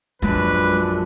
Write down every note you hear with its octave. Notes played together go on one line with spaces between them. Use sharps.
A#1 F#2 G#3 D4 B4